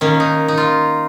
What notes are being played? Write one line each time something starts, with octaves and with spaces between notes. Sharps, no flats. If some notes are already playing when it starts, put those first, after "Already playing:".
D#3 A#3 C#4
D#4
D#4
F4